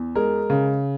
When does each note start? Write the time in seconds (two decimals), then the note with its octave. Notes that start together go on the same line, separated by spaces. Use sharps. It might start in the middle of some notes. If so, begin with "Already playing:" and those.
Already playing: E2
0.15 G#3 A#4
0.50 C#3